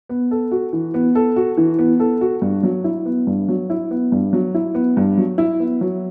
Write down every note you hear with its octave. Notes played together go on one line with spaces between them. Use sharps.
B3
A4
F#4
E3
B3
A4
F#4
E3
B3
A4
F#4
G2
F#3
E4
B3
G2
F#3
E4
B3
G2
F#3
E4
B3
G2
F#3
E4
B3
F#3